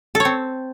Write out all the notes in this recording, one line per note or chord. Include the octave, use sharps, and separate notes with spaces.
A4
C#5
C4